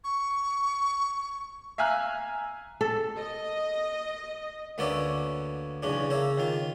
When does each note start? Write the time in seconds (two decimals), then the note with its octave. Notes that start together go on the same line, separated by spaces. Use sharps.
0.04 C#6
1.78 E5 F5 G#5 A#5 F6 F#6
2.81 A4
3.18 D#5
4.78 D2 A#3 B3 C#4 D5 E5
5.83 B1 E2 C#3 C#4 D4
6.10 C#3 A#3 E5
6.38 D#3 F4